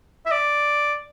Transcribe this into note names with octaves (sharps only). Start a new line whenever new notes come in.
E5
D5